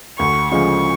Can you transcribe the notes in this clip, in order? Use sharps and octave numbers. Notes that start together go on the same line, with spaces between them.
D2 C#6
C#3 F3 G#3 C#6